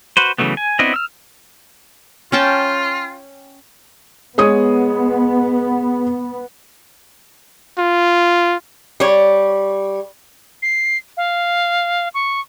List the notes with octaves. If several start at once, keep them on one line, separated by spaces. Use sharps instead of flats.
F#4 B4 C5
C#3 E3 F#3 A3 B3
G#5
B3 C4 D4 E4 D#5
E6 F6
C#4 F4 G5 A5
G#3 B3 C#5 D#6
F4
G3 C#5
C7
F5
C#6